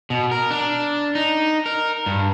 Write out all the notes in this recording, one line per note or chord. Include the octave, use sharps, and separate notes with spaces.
B2
A#4
D4
D#4
A#4
G2